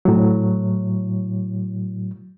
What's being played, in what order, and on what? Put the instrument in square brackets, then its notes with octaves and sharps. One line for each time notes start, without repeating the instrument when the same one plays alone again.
[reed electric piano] A2 F#3